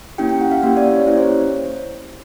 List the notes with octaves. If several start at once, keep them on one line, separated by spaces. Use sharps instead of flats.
A#3 C#4 E4 G4 G5
G5
F#5
F5
A#3 C#4 E4 G4 F5
D5
C#5
A#3 C#4 E4 G4 C5
C5
C#5